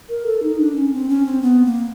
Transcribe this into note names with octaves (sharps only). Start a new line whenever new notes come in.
A#4
A4
D#4
D4
C#4
C4
C#4
C4
B3
A#3